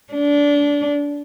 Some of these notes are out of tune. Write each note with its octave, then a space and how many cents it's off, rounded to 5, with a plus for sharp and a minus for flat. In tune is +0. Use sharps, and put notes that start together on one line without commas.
D4 -20